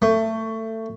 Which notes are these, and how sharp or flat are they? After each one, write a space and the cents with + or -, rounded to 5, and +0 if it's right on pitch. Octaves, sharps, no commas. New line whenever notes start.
A3 +20